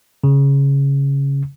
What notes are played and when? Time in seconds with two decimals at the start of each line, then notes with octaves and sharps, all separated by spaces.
0.24 C#3